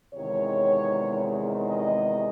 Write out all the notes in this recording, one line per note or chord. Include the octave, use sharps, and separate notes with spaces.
E2 C3 D#3 G#3 C#5
D#5